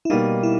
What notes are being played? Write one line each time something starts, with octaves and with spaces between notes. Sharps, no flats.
E4
B2 G3 A#3 D#4
E4